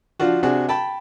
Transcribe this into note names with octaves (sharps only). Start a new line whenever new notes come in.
F3 D4 F4 F#4
C3 D4 F#4 G#4
G5 A5 B5